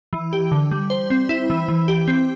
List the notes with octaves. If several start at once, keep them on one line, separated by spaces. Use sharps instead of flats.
E3
G4
D3
G3
C5
C4
E4
E3
E3
G4
C4